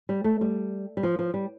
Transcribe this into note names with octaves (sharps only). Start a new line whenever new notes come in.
G3
A3
G3
G3
F3
F3
G3